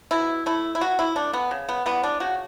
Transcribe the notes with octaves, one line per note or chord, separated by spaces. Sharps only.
B2 E4
A3 E4
E4
B2 F#4
E4
A3 D4
B3
C#3
B3
E3 G3 B3
D4
C#3 F#4